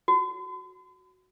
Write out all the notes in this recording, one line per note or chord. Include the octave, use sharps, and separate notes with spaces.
F#4